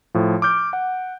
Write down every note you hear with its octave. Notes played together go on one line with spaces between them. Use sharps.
A2 F3
D6 F6 G6 D7
F#5